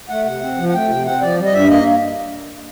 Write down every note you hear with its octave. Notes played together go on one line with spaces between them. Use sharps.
A3 F#5
C3 F#5
C4
F3
F#5
A3 G5
C3
C4 F#5
F3 D5
G3
D#5
G2 E5
A#3 D#5